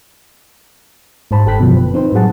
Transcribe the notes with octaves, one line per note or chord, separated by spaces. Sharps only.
G#2 G4 C5 A5 B5
G1 G4 A4 G5 F#6 B6
F#2 B2 D3 F3 F#3
B4
C4 D#4 B4 C5
A2 F#3 G3 G#4 F#5 A5